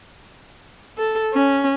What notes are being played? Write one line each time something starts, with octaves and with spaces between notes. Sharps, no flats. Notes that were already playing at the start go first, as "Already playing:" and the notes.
A4
C#4